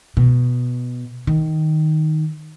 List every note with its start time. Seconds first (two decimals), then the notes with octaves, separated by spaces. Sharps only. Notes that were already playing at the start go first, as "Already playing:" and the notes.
0.17 B2
1.27 D#3